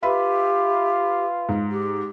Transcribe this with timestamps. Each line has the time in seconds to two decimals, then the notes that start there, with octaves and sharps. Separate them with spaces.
0.03 F4 G4 B4 E5 B5
1.49 G#2
1.71 G4